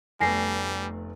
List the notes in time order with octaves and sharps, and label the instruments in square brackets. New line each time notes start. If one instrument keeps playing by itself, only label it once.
[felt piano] F1 A3 B3 [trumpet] G3 [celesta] G#5 A#6 C7